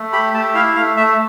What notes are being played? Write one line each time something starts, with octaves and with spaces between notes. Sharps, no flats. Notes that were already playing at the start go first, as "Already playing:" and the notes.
Already playing: A3
G4 B5
A3 A5
E4 F5
A3 F5
A3 E5